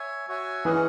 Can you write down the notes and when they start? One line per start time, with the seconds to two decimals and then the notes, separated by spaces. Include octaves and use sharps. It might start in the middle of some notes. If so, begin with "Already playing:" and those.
Already playing: C#5 E5 G#5
0.28 F#4 C#5 E5 G#5
0.65 E3 C#4 G#4 D#5 F#5